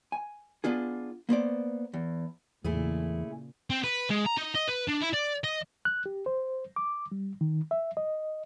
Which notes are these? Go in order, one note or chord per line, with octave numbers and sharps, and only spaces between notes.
G#5
B3 D4 F4 G#4
A#3 B3 C5 D5
E2
E2 A#2 C#3 A3 E4 G#4
C4
B4
G#3
A#5
D#4
D#5
B4
D4
E4
D5
D#5
F#6
G4
C5
D6
G3
D#3
E5
D#5